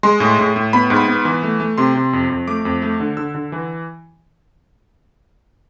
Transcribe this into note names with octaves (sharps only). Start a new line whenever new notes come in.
G#3 C6
A2
A2
A2
B3 B5
G#2
B5
B3
E3
A3
A3
C3 C6
C3
F2
F2
A3 D6
F2
A3
D3
D3 E6
D3
E3